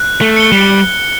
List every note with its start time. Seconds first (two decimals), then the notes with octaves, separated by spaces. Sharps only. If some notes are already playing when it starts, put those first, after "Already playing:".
Already playing: F#6
0.21 A3
0.36 C#7 G7
0.52 G3